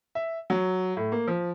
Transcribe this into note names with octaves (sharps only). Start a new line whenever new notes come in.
E5
F#3
A2
A#3
F3